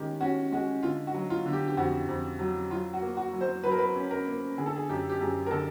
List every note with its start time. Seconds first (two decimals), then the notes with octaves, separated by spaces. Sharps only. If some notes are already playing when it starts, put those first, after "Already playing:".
Already playing: D#3 G#3 C#4 G4
0.20 C#4 F#4
0.52 G#3 F#4
0.83 D3 F4
1.07 F#4
1.14 F#3
1.30 F4
1.46 D3
1.53 G4
1.68 G4
1.77 F2 F#4
2.08 F2
2.39 F#3
2.70 F#3 F4
2.93 F#4
3.02 A#3
3.17 F#4
3.33 F#3
3.41 C5
3.64 F#3 B4
3.72 A#4
3.78 B4
3.96 C#4
4.11 A#4
4.27 A#3
4.57 D3 G#4
4.66 A4
4.76 G#4
4.89 F#2 G4
5.09 G4
5.21 F#2 G#4
5.46 A#4
5.51 D3 A4